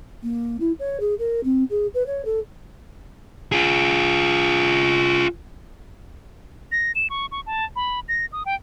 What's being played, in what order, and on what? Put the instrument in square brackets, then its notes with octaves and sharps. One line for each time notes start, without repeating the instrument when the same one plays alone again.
[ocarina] A#3
E4
C#5
G#4
A#4
C4
G#4
B4
C#5
A4
[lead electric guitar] F4 G#4
[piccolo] A#6
E7
C#6
C#6
A5
B5
A#6
D#6
G5